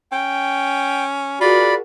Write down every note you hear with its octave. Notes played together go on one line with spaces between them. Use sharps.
C#4 G5
F4 F#4 G#4 A#4 D5 B5